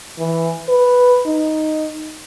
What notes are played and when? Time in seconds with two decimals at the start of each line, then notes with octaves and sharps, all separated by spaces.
0.18 E3
0.68 B4
1.26 D#4